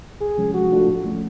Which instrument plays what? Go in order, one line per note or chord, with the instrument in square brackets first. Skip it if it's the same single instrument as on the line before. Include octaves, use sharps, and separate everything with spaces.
[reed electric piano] C#2 [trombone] G#4
[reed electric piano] C3 F3 G#3 C#4
[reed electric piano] F3 [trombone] F#4
[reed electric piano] A3 D4 F4 A4
A2
F3 A3 C#4